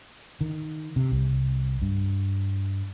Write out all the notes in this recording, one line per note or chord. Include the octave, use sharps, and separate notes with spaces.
D#3
C3
C2
G2